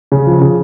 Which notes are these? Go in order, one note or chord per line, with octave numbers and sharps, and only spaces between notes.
C#3
F3
C#3